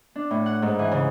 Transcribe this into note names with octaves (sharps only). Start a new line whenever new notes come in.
D4
A2
F#5
G#2
E3
C#3